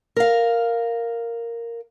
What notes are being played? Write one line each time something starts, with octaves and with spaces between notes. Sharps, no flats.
A#4 F5